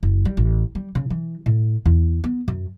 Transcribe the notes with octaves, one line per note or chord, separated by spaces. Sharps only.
F#1
G3
A1
G3
C#3
E3
A2
E2
B3
F#2